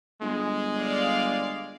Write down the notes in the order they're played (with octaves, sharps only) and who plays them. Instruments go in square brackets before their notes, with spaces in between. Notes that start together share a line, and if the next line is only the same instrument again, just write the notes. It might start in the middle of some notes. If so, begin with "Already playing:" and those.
[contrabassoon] G1 [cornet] G#3
[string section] D5 F5